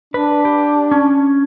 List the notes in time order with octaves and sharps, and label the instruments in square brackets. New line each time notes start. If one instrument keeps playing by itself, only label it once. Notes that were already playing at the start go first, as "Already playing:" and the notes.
[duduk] D4 [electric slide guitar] B4
[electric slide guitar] G4
C#4